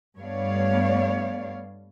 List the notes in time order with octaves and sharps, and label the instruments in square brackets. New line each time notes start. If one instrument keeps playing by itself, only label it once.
[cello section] G2 A3 B3 C#5 D5 F5